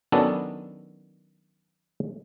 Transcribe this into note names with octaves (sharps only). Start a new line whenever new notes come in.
D#3 F#3 B3 C#4 D4 A4